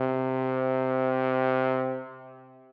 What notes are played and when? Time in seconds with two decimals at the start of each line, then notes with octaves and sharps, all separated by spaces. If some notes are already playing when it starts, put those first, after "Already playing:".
Already playing: C3